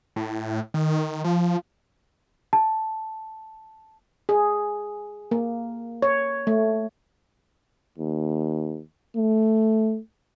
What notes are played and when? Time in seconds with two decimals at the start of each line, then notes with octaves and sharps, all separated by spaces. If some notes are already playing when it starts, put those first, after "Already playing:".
0.16 A2
0.74 D#3
1.24 F3
2.53 A5
4.29 G#4
5.31 A#3
6.02 C#5
6.47 A3
7.98 D#2
9.16 A3